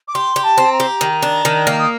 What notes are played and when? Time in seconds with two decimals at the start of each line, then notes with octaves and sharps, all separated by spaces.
0.08 D6
0.15 G4 C6
0.36 G4
0.44 A5
0.58 C4
0.72 A#5
0.80 G4
1.01 D#3
1.22 D4
1.45 D#3
1.67 A#3
1.79 D#6